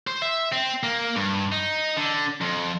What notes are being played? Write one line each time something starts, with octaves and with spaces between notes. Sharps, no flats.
C5
E5
C4
A#3
G2
D#4
D3
F2